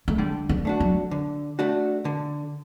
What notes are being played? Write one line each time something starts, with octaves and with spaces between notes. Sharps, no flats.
A3
D3 G3
G3
A3 D4 F#4
F#3
D3
A3 D4 F#4
D3